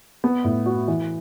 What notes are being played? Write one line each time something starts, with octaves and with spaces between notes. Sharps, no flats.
B3
A2
F#4
E3